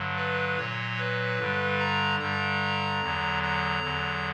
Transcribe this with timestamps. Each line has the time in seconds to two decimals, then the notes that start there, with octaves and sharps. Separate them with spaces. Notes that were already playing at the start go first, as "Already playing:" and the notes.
Already playing: G2 D3 F#3
0.17 B4
0.57 A#2 F#3 C#5
0.98 B4
1.39 G2 D3 G3
1.79 A#5
2.20 G2 D3 G3 A#5
3.02 E2 D3 F#3
3.43 A#5
3.83 E2 D3 F#3